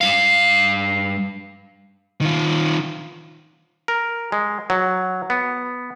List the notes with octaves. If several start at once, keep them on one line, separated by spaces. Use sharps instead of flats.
G2 F5
D#3 F4
A#4
G#3
F#3
B3